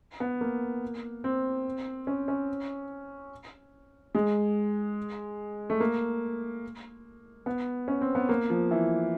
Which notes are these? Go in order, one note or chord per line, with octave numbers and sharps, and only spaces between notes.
B3
A#3
C4
C#4
C#4
G#3
A3
A#3
B3
C#4
C4
B3
A#3
F3
E3